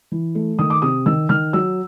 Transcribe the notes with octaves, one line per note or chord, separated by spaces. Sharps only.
E3
A3
D#3 D#6
D6
C3 D#6
D#3 E6
D#3 F6
F#3 E6